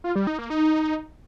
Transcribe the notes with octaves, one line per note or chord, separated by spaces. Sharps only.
F4
G3
D#4
A#3
D#4